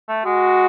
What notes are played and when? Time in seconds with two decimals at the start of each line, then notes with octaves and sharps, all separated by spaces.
0.08 A3
0.26 G#3 F#4